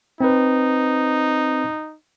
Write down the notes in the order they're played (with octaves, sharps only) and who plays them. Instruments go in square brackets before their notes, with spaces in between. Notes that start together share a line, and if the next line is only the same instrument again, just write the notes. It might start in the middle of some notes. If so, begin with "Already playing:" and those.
[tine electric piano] C4 B4 [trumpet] D#4